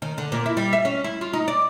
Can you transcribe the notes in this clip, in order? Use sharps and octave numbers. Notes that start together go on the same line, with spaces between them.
D#3
D3
A#2
E4
G3
E5
C#4
E4
F4
D#4
D5